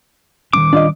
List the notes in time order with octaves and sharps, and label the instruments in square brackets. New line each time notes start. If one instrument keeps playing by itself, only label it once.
[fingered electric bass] D#3 G3 C#4 [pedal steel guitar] D6
[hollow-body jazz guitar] D4 F4 D#5